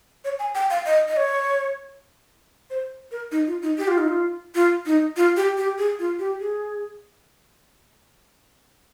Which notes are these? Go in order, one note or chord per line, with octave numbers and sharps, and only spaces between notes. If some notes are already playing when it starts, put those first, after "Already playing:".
C#5
G#5
G5
F5
D#5
D#5
C#5
C5
A#4
D#4
F4
D#4
G4
F4
D#4
F4
F4
D#4
F4
G4
G4
G#4
F4
G4
G#4